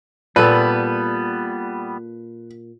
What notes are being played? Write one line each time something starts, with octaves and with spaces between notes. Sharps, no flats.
A#2 G3 B3 A4 B4